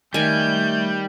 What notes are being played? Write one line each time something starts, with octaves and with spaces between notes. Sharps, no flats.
D#3 G3 A3 G#5 G6